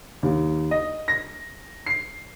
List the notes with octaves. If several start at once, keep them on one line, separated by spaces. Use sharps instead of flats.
D#2
D#5
A#6
C7